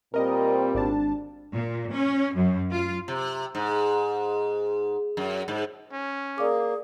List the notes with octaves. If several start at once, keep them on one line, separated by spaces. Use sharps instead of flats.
A#2 G3 C4 A#4 D#5
G#1 D4 A5
A#2
C#4
F#2
F4
C3
G#2
F#2
G#2
C#4
A#3 G#4 D5 F5 D6